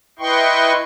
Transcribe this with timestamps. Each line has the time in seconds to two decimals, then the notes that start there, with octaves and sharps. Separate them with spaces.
0.19 E4 B4 D#5 G5 C6 C#6